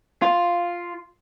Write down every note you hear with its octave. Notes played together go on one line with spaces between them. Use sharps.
F4